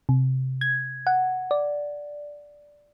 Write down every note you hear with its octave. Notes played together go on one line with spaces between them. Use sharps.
C3
G#6
F#5
D5